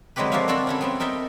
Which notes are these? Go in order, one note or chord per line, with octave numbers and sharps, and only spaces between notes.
D3 F#3 G#3 C4 G4 B4
F3 A#3 F#4 G4 E5 F5
C4 D4 F#4 A4
C#4 E4 A4
B3 C4 E5
D#4 A#4 E5 G5 A5